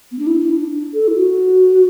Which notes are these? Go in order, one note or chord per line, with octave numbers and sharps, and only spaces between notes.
B3
D4
E4
E4
D4
A4
E4
F#4